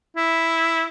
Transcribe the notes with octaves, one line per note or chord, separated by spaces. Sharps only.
E4